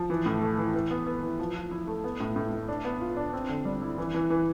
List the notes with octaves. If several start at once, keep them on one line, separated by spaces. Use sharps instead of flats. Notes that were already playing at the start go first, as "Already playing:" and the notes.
Already playing: F3
E3
A2
A3
E3
E3
B3
B3
E3
F3
F3
E4
A3
B3
A2
A2
A2
D4
B3
F4
D4
C4
D3
G3
E4
E3
E3
E3